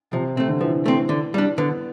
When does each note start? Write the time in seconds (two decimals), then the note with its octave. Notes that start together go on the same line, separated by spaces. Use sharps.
0.13 C3 F3
0.36 C3 A3 C4
0.48 D3
0.61 E3 F3
0.86 A3 C4
1.09 D3
1.34 G3 D4
1.58 D3 B3